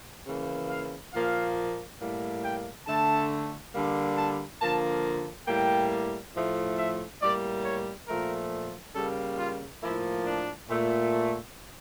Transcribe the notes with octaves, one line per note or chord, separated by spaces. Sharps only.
C#3 E3 A#3
F5
A#2 F3 A#3 F5
A2 G3 A#3
G5
D3 A3 A5
D3 G3 A#3
A5
D3 F3 A#3 A5
A2 G3 A#3 G5
A2 F3 A3
E5
A2 G3 A#3 D5
C#5
A#2 F3 A3 A#4
C#3 G3 A#3 A4
F4
A2 F3 A#3 E4
D4
A#2 A3